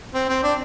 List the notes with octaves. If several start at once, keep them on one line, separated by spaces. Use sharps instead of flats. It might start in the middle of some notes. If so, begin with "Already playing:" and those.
C4
C4
D4